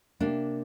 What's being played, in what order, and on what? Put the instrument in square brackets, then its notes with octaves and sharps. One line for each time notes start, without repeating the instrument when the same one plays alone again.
[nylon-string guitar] C3 A#3 D4